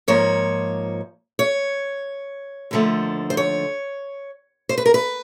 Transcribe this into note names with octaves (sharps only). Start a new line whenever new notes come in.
G#2 F3 A#3 C#5
C#5
D#2 D3 F3 A3
C5
C#5
C5
B4
A#4
B4